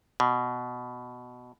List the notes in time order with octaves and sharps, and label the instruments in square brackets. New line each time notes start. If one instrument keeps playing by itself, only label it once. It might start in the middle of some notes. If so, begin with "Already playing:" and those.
[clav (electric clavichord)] B2